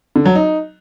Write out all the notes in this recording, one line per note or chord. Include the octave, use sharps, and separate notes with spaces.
D3
F#3
D#4